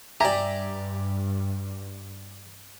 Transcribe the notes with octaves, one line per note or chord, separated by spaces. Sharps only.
G2 G4 D5 E5 G#5 A#5